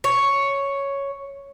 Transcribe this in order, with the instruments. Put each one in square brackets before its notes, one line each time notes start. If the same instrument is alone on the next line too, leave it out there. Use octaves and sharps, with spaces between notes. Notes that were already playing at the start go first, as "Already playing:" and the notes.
[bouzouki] C#5